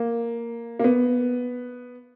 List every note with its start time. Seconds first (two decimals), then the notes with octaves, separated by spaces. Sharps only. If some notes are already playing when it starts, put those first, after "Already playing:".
Already playing: A#3
0.79 A#3
0.84 B3